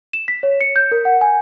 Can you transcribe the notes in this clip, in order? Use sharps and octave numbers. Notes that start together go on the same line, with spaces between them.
E7
B6
C#5
C#7
G6
A#4
F#5
G#5